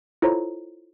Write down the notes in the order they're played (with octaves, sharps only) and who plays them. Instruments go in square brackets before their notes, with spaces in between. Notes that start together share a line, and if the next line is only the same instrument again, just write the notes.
[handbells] E4 F4 A4 C5 C#5 A#5